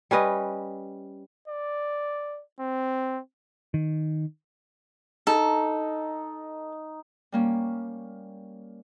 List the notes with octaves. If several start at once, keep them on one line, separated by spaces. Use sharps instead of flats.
G3 C#4 B4 D#5
D5
C4
D#3
D#4 A4
G3 A#3 C#4